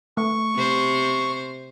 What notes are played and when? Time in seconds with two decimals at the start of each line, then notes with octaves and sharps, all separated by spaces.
0.17 A3 C#6
0.55 C3 C5